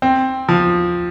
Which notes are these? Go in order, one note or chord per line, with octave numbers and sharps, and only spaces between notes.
C4
F3